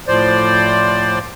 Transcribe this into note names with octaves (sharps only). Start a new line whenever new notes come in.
A2 F3 C5 D5